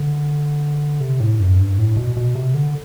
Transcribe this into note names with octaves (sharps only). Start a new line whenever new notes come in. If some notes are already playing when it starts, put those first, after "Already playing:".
Already playing: D3
C3
A2
F#2
G2
A2
B2
B2
C3
D3